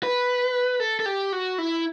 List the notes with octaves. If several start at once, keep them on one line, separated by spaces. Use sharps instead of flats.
B4
A4
A4
G4
F#4
E4